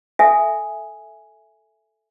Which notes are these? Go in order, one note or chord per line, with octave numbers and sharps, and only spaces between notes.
A4 E5 G#5